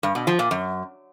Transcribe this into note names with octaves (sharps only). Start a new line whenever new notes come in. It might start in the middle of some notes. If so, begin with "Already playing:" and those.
G2
B2
F3
A#2
F#2